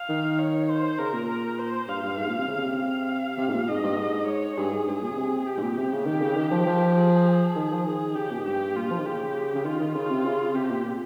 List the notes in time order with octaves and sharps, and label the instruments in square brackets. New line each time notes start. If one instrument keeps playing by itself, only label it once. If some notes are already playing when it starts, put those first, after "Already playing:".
Already playing: [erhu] F5
[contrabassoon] D#3
[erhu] C#5
C5
[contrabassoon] C#3 [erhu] A#4
[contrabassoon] A#2
[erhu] A#4
C5
[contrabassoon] G2 [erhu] F5
[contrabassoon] G2
G#2
A#2
C3
C#3
C#3
C3
[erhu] F5
[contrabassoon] C3
G#2
A#2
[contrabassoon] G#2 [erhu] D#5
[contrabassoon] G2
G#2
[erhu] C#5
[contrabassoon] G2 [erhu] G#4
[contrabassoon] G#2
G2
A#2
C#3
C3
[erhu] G4
[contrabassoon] G#2
A#2
C3
C#3
[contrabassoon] D#3 [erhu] G4
[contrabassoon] C#3
D#3
F3
F3
[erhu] G#4
[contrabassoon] D#3
F3
[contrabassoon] D#3 [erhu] G#4
[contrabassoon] C#3 [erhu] G4
[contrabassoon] A#2
G#2
[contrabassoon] G2 [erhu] G4
[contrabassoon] A#2 [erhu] F4
[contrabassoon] F3
D#3
[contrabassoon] C#3 [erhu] G4
[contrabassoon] C#3
[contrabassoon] D#3 [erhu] F4
[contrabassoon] D#3
[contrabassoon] C#3 [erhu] F4
[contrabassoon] C3
C#3
[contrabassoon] C3 [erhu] G4
[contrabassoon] A#2
A#2